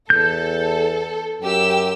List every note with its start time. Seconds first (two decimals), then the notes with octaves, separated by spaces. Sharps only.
0.10 E2 A4 G6
1.42 F#2 G4 E6